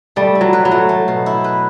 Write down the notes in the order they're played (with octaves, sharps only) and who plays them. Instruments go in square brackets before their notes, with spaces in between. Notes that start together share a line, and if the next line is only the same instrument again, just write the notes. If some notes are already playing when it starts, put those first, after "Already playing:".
[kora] G3 [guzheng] A3
[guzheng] E4
[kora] F#3
[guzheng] B4
[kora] F#3
[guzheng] A3
A3
B2
E4
B4